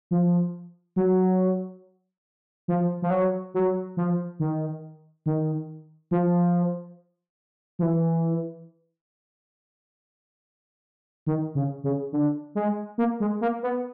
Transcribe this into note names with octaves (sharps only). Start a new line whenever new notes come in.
F3
F#3
F3
F3
F#3
F#3
F3
D#3
D#3
F3
F3
E3
D#3
C#3
C#3
D3
G#3
A#3
G#3
A#3
B3